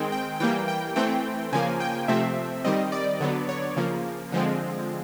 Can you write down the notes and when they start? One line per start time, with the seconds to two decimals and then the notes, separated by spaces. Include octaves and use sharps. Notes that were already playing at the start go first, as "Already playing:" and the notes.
Already playing: D#3 G#3 C4 G5
0.12 G5
0.40 E3 G3 A#3 G5
0.68 G5
0.96 E3 A3 C4 G5
1.53 C#3 F3 A#3 G#5
1.80 G5
2.08 C3 F3 A3 C4 E5
2.64 D#3 G3 C4 D#5
2.92 D5
3.20 D3 F#3 B3
3.49 C#5
3.77 C#3 F3 A#3
4.32 D3 F3 G#3 C4